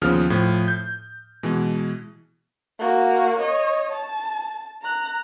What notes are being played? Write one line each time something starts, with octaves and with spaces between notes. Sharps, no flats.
D#2 C#3 F3 B3 D#6 F6
A2 F3
G6
B2 E3 G#3
A#3 F#4
C#5 D#5
A5
A#5 F#6